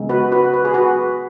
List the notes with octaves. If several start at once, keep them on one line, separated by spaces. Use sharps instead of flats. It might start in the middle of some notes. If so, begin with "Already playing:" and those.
Already playing: C#3 G#3 B3
F#4 B4
F#4 B4
B4
G#4
F#4 B4